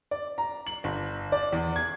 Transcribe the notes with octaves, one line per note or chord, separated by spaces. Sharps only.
D5
A#5
F#7
G1
D5
E2
G#6